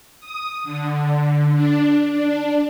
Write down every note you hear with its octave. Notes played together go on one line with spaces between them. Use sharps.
D#6
D3
D4
D4